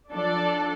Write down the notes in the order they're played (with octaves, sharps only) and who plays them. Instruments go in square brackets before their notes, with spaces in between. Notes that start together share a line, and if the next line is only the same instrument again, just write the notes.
[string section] F3 D4 A4 D5